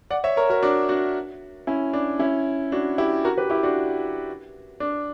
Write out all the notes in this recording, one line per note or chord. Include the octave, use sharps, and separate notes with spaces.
D5 F#5
C#5 E5
A#4 C#5
F#4 A#4
D4 F#4
D4 F#4
C#4 E4
D4
C#4 E4
D4 F#4
E4 G4
F#4 A#4
G4 B4
E4 G4
D4 F#4
D4